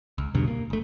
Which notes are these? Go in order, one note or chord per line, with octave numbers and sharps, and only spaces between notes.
C#2
E2 G2 B2 D3
A#3
F#1 A3